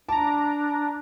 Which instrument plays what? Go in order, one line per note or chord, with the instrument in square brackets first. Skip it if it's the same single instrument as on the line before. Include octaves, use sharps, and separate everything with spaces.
[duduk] D4 [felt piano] A5 [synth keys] A#5 D6